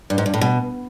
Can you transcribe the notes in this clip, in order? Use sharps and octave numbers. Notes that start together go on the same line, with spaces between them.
G2
G#2
G2
A2
B2